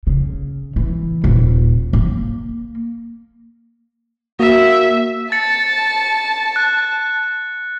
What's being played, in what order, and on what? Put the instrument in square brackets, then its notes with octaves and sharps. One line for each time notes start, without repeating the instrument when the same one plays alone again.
[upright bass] C#3
E3
D#1
A#3
[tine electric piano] A#3 F#4 [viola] E5
[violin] A5 [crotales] A6 C#7
[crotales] F#6